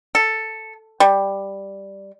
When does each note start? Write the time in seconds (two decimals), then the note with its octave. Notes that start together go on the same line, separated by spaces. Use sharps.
0.15 A4
1.00 G3